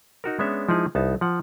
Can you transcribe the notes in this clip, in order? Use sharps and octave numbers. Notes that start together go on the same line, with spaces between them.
D#4 F#4 A#4
G#3 B3 C#4 D4 C#5 E5
F3 G#3 D#4 E4 G#4
C2 B3 D#4 A5
F3 F#5